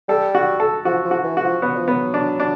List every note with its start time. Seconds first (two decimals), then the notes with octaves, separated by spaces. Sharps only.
0.09 G3 A4
0.35 F#4
0.60 A4
0.85 F3 F#4
1.05 F3
1.11 F#4
1.24 E3
1.37 F#4
1.44 F3
1.62 F#3 B3
1.76 F3
1.88 F#3 B3
2.14 D4
2.40 D4